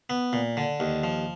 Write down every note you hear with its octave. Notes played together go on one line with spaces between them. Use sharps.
B3
A#2
D3
D#2
F3